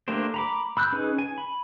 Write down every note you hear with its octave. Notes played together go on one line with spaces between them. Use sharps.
A3 A#3 D4 G4 C5
A#5 B5 D6
B5 E6 F#6 G6
C#4 D#4 G#4 B4
G#5
B5